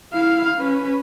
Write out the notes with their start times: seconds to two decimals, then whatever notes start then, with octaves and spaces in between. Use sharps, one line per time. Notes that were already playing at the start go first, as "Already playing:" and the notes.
0.13 E4 F5
0.58 C#4 B4